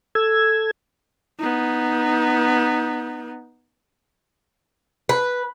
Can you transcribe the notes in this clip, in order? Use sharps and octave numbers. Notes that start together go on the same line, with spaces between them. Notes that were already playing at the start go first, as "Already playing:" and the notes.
A4 E6 G#6
B3 D#4
B4